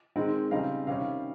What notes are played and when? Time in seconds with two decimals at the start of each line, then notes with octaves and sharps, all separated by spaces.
0.16 D#3 G#3 C4 D#4
0.51 C#3 G3 C4 D#4 F5
0.87 C3 D#3 G3 C#4 F5